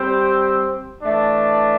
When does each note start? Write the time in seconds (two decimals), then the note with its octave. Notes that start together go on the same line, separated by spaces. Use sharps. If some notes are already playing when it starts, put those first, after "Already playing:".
Already playing: G3 C4 G4 C5
1.03 E3 A3 D4